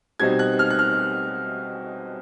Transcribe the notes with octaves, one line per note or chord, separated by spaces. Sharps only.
B2 G3 C4 D#4 G#6
F#6
F6
F#6
F6